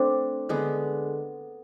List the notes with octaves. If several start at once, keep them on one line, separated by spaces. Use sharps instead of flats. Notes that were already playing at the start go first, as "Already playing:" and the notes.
Already playing: A3 C4 D4
D3 G#3 B3